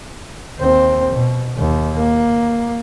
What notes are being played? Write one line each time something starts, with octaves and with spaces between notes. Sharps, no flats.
D#2 C4
B2
D#2
A#3